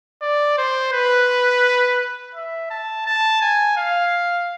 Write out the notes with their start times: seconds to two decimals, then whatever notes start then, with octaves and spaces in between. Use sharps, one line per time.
0.22 D5
0.58 C5
0.93 B4
2.35 E5
2.70 A5
3.06 A5
3.41 G#5
3.77 F5